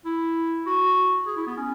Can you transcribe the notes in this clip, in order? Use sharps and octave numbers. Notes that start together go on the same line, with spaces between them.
E4
F#4
G#4
E4
B3
C#4